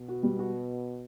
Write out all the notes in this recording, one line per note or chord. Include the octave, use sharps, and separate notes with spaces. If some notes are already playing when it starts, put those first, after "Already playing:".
Already playing: B2
F#4
G3
F#4